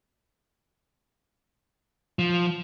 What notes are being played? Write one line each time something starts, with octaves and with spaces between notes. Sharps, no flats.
F3